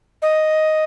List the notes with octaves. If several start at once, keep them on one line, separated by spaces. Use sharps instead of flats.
D#5